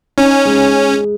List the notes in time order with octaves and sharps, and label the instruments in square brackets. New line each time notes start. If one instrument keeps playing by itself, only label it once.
[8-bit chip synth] C#4 [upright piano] D#4
[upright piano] G#3